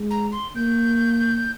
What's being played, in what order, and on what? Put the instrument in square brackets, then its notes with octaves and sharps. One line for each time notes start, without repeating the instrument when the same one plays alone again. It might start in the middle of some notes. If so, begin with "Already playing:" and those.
Already playing: [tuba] G#3
[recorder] A#5
C6
[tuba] A#3 [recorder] G6